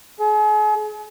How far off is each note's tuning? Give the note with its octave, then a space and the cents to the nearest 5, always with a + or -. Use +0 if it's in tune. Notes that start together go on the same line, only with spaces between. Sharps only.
G#4 +40